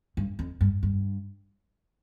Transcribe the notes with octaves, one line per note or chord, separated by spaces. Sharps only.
G2
F2
G2
G2